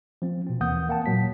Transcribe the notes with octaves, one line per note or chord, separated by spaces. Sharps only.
F3 C4
B2 C4
D#2 E3 A#3 F#5 D#6 G6
A#3 F#5 G5 A5
A#2 F#3 B6